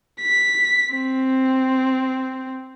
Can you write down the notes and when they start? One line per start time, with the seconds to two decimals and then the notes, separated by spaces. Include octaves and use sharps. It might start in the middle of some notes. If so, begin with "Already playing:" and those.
0.22 B6
0.95 C4